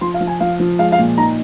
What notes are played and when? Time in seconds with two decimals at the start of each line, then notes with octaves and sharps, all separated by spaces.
0.01 F3 C6
0.14 F5
0.21 F3
0.27 G#5
0.40 F3 F5
0.60 F3
0.79 G#3 F5
0.92 F5
0.99 A#2
1.18 D#4 A#5